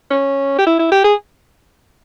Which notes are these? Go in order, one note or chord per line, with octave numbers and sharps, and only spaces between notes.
C#4
G4
E4
E4
G4
G#4